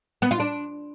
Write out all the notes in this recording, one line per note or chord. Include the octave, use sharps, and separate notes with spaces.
B3
F4
D4